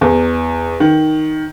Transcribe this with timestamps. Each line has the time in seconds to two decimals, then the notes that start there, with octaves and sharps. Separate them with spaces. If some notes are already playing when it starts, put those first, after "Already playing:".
0.01 E2
0.80 D#3